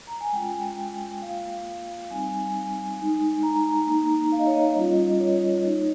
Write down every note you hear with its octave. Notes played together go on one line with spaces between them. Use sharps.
A#5
G#5
G#3 C#4 F4 G5
A#3 F4 F5
G3 C4 D#4 G#5
G#3 D#4
A#5
A#3 D#4
F5
D#5
C#5
D#5
G3 C#4 F4
C#5
A#3 D#4